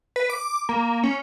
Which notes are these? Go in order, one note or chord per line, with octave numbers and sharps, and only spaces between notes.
B4
D6
A#3
C#4